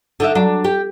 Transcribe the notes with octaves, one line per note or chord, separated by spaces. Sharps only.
D3 D#4 E5
F#3 D4
G4